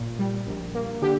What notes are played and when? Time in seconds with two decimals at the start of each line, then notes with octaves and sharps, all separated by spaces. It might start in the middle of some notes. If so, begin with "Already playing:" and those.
Already playing: G1 A#2
0.19 G3
0.47 A#1
0.75 A#3
1.02 D3 G4